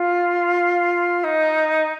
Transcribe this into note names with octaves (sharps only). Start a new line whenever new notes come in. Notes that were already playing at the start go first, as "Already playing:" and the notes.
Already playing: F4
D#4